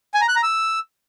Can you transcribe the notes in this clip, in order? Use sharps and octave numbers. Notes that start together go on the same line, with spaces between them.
G#5
A#5
F#6
A#5
E6